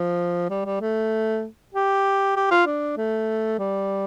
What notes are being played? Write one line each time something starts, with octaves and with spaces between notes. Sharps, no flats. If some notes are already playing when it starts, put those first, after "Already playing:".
Already playing: F3
G3
G3
A3
G4
G4
F4
D4
A3
G3